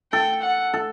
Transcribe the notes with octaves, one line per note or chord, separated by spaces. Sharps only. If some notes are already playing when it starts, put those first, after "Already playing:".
A4 G5
F#5
A4